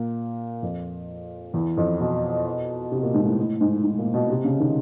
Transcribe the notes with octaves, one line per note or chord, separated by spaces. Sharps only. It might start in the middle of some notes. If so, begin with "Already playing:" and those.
Already playing: A#2
F2
E2
F2
B2
C3
A#2
G#2
A2
A2
G#2
G#2
A#2
B2
C3
C#3
D#3